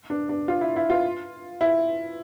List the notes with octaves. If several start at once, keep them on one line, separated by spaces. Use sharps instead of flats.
D4
D4
F4
E4
E4
F4
E4